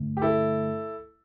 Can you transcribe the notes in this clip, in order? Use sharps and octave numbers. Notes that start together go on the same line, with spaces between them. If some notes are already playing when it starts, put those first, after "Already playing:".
Already playing: G2 D3 A3
G4
E4 A4